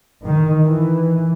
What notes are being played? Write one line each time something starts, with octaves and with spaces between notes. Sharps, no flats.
D#3
E3